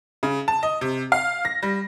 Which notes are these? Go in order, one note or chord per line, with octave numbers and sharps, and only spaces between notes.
C#3
A5
D#5
C3
F5
A#6
G3